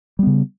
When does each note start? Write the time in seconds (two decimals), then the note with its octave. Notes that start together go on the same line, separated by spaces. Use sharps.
0.19 G3
0.23 B3
0.27 C#3